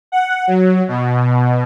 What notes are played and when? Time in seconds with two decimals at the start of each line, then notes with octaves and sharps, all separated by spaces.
0.12 F#5
0.47 F#3
0.88 B2